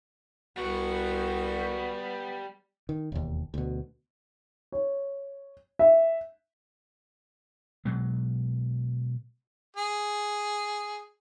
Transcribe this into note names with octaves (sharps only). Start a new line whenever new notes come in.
C2 G3 B3 F#4 F#5
D#3
E1 D#2
D2 B2
C#5
E5
B2 F#3 G#3
G#4